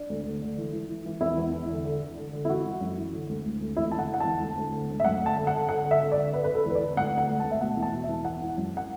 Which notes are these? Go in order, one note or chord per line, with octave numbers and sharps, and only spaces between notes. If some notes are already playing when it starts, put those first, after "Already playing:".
Already playing: D4
D2
D3
D3
E3
E3
E3
E3
E2 E4
E2
E2
D3
D3
D3
D3
D3
E4
E3 F#4
E3
F#2
E3
D3
D2
D2
D2
E2 E4
D3 A5
F#5
D3 F#5
E2 A5
D2
D2
D3
D2
E5
F#2 F#5
D3 A5
D3
F#5
D3
D3 F#5
D3
E5
D3
D5
D3
D3 B4
B4
D3
A4
E2 B4
D5
D3
D2 F#5
D3 F#5
D2
A5
D2
E5
B2 F#5
E2
A5
B2
E5
E2
E3 F#5
E3
F#2
F#5